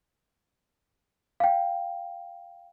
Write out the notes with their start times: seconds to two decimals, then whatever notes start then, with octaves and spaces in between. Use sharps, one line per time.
1.40 F5 G5